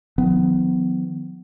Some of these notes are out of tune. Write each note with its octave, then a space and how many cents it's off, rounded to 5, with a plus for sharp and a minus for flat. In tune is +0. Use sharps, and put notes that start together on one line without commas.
D#3 +15 F#3 -45 B3 +30